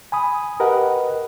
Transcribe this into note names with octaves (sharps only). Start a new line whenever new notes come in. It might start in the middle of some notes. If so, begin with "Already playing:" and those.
G#5 B5 D#6
G4 A#4 B4 D#5 F#5